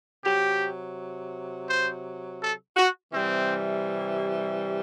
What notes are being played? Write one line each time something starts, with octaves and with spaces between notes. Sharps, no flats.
C3 F#3 G4
C5
A4
F#4
C3 E3 G3 C4